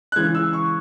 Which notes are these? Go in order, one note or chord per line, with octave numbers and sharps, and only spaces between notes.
F#6
C#3 E3 G#3 G#6
E6
C#6